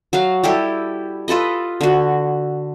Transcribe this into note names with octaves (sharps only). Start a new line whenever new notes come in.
F#3 F#4 F5
G3 E4 G4 A4
F4 A4 B4 D#5
D3 F#4